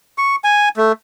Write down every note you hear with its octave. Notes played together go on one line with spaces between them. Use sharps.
C#6
G#5
A3